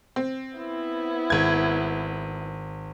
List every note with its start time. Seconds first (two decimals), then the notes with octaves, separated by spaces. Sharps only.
0.16 C4
0.57 B3 E4
1.30 G#1 G#6